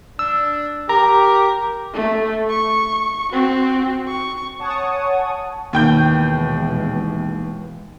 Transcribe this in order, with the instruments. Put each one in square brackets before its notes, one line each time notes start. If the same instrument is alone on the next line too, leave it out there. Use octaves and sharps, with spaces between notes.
[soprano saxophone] D4 [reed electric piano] E6
[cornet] G4 [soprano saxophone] A#4 [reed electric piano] A#5
[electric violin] A3
C#6
C4 F#4
C#6
[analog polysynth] C#5 F#5 G#5 A5 C#6 D#6
[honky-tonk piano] D#2 G5 G6 [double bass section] B2 E3 G#3